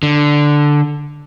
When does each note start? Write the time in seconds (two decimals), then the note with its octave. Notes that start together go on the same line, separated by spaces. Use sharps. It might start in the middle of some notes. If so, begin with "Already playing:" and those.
0.03 D3